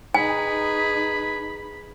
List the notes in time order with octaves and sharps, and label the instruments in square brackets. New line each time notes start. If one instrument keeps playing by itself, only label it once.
[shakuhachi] D#4 [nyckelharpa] G#4 B4 [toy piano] G#5 [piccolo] B5